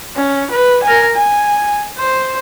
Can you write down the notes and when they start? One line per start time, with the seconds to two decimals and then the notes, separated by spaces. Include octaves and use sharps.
0.16 C#4
0.51 B4
0.83 A#4 G#5
1.15 G#5
1.98 C5